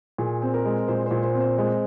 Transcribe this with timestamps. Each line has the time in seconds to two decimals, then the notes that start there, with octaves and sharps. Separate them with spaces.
0.18 A#2 G#4
0.42 C4
0.54 A#4
0.65 G#3
0.88 A#2 C5
1.06 A#2 C5
1.23 C5
1.34 C4
1.40 C5
1.58 G#3